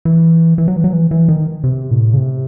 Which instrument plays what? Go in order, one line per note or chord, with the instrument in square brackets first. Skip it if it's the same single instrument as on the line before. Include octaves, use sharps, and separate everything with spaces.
[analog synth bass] E3
E3
F#3
E3
F#3
E3
E3
D#3
C3
A2
C#3
C3